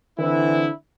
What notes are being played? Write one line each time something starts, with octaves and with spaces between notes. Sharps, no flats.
D3 E3 C4 D4 E4